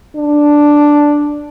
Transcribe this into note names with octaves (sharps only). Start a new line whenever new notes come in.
D4